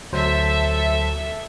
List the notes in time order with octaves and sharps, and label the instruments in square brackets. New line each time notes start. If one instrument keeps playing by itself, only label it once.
[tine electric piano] D2 F#3 C5 [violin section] A4 E5